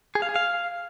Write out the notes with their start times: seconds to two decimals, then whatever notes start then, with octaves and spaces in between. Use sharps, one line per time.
0.15 G#4
0.22 F5
0.29 G#4
0.36 F5